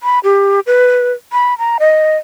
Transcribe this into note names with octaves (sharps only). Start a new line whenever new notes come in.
B5
G4
B4
B5
A#5
D#5